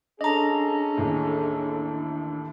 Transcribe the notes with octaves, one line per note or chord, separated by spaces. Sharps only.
C#4 D4 G#4 A4 D#5 A5 A#5
A1 D#2 A2